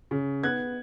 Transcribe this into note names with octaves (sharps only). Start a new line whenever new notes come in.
C#3
B3 F#6 G#6